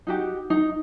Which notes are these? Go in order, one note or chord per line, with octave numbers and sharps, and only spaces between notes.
D#4 F#4 G4
D#4